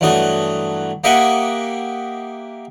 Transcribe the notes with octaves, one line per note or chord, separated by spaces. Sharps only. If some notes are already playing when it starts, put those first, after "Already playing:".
G2 E3 F#3 A3 D#5
A#3 G4 D#5 E5 F#5 G#5